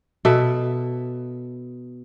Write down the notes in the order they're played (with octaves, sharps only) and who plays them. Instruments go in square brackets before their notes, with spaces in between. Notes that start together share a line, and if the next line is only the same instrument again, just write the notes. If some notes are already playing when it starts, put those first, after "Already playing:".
[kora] B2 A4 E5